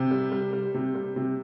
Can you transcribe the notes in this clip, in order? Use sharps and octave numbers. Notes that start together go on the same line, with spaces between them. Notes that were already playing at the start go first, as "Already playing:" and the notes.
Already playing: C3 C5
G3
G3
G3
C3
G3
C3